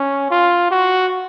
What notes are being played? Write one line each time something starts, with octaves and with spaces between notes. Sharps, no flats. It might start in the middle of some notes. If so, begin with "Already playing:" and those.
Already playing: C#4
F4
F#4